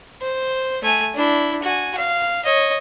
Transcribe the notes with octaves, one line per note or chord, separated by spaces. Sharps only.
C5
A3 G#5
D4 E4
F#4 G#5
F5
C#5 D#5